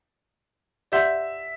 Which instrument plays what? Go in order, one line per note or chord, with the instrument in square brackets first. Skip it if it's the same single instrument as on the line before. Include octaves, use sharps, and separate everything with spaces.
[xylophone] G4 D5 F#5 C6 G6 [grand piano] E5